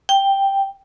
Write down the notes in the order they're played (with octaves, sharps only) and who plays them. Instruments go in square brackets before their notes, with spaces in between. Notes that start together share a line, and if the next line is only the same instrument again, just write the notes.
[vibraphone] G5